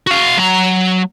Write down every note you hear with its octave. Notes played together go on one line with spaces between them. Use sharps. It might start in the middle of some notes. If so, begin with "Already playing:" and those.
F#4 F5
F#3 A#5